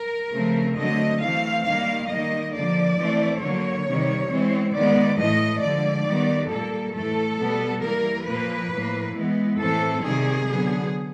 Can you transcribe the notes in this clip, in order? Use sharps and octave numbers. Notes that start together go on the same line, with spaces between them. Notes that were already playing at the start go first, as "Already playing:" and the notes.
Already playing: A#4
C#3 F3 A3 C4
D3 F#3 A3 C4 D#5
E3 A3 C4 F5
D#3 G3 A#3 F5
D#3 G3 A#3 D#5
D3 F3 A#3 D5
E3 A3 C4
D3 F#3 A#3 C#5
C3 D#3 G3
E3 G#3 C4
D#3 G#3 B3 D5
A2 E3 A3 D#5
D3 F3 G#3 D5
D#3 G3 B3
A#2 G3 A#3 A4
A2 E3 A3 A4
B2 G3 B3
E3 G3 A#3 A#4
A#2 F3 A#3 B4
A2 F3 A#3
E3 G#3 B3
A2 E3 A3 C4 A4
C3 D#3 G3 A#3 G#4
D3 F#3 B3